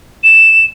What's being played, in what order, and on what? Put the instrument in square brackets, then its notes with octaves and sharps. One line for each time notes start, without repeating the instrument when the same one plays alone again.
[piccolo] E7